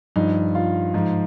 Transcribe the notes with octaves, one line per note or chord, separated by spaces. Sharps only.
G2 F3 D#4
F4
G#2 F3